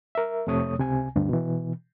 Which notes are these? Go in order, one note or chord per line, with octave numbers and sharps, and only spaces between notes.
A#4 E5
F2 C3 A3 C#5 D#6
C#2 C3 G#5
D2 G2 D3
B2 E3